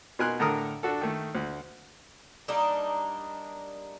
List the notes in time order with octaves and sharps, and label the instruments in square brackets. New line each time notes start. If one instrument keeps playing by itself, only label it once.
[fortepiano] B2 D#4 A#4 G#5 C6 F#6
A2 D3 A4 A#4 A#5 D#6
D4 F#4 A4
D#3 A3
D2
[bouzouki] G3 A#3 D4 D#4